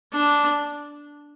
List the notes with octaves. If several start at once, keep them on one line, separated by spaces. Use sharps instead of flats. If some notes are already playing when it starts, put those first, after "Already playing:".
D4